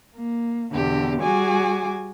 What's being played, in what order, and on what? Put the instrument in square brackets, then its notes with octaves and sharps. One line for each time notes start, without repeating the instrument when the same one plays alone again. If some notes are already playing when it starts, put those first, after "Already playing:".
[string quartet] A#3
E2 B2 D3 G4
G3 F#4 G#4 G#5 D6